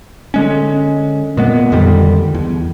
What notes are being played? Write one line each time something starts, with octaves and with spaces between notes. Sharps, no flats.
D3 G#3 C#4
A#2 G#3 B3
F2 D3 D#3 G3
E2